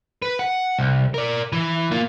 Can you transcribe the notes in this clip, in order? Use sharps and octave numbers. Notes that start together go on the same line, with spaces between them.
B4
F#5
C2
A#4 D5
E3
A#3 F4